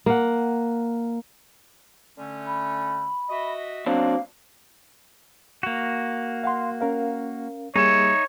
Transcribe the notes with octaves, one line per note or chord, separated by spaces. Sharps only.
A#3 F#5
D3 A3 C#4
B5
F#4 D#5 E5
F#3 A#3 C4 D4 F5
A#3 F#4
F5 F#5 C6
C#4 A#4 F5
G3 A#3 D#4 G#4 C#5 E5